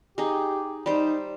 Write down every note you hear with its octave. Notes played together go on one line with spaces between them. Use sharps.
D#4 G4 G#4
G3 D#4 C5